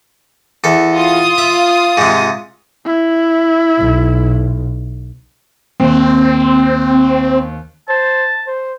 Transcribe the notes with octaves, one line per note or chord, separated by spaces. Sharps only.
E2 A4
F4 D#6
E5
G#2 C3
E4
B1
D#2 C4
C5 A5
C5